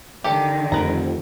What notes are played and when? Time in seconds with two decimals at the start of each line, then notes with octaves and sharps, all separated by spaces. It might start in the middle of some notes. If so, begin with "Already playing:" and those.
0.24 D3 D#3 G4 A4 A5
0.72 F1 F2 A#4 B4 A#5